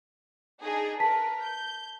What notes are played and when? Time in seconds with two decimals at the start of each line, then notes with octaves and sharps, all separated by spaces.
0.62 D4 D#4 G#4
1.00 A#4 B4 A5 B6
1.43 G6